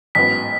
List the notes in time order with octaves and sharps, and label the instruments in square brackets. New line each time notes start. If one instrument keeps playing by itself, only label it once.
[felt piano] A1 G#2 F#3 B3 [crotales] B6